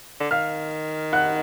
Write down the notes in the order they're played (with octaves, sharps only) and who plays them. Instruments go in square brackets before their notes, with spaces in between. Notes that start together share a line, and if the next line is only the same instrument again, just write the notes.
[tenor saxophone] D3
[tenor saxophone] D#3 [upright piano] F5 F6
[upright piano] F#5 F#6